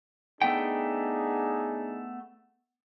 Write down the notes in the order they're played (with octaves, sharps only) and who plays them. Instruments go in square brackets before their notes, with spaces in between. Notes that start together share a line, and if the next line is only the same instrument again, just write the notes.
[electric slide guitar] A3 B3 G5 [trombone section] D4 D#4 G#4